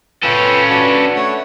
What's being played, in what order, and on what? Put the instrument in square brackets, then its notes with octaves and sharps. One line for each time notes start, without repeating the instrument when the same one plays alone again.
[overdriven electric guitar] C#4 A4 [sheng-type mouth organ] F4 B4 G5
[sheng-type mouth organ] D4 F#4 B4
A3 C#5 F#5